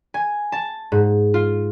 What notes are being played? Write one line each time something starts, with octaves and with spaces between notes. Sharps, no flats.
G#5
A5
G#2
F4